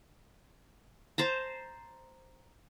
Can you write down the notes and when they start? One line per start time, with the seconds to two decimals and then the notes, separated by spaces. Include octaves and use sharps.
1.18 C5 A5 A#5